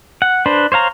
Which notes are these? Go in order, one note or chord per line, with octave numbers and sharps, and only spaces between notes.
F#5
D4 B4 C5
C5 C#5 F5 A#5